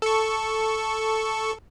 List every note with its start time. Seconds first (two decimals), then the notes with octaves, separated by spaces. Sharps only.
0.02 A4 C#6